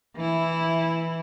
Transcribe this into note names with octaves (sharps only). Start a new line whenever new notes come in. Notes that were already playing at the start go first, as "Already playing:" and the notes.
E3 E4